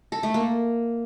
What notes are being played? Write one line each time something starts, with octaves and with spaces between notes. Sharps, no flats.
A4
A3
A#3